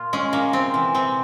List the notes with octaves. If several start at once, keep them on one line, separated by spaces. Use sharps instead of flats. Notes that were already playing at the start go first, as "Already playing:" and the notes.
Already playing: A#2 F4
G#3 C#4
A#2 A#3
C3 C4
E3
C3 C4